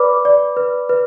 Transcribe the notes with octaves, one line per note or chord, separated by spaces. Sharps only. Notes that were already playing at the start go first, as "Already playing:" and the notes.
Already playing: B4 D5 B5 D6
D5
B4
B4